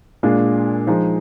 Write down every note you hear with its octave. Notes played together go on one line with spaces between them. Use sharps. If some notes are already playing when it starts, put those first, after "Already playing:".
A#2 G#3 D4 F4
F3 G#3 D#4